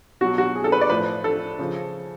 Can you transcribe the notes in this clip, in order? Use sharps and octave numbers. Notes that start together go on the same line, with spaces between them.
B2 F#3 F#4
F#4
G#4
A4
B4
D5
A2 F3 B4
A4
C#3 F3